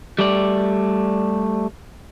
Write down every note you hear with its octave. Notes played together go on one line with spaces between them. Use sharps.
G3 A3 D5